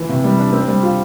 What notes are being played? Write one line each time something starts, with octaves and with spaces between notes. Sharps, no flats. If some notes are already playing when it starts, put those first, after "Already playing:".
Already playing: E3
C3
G3
D4
C4
G3
F4